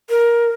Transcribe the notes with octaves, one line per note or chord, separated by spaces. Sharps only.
A#4